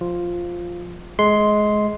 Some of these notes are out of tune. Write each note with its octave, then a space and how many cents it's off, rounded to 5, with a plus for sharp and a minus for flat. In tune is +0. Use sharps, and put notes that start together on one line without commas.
F3 +0 F4 +0
G#3 +20 C6 +0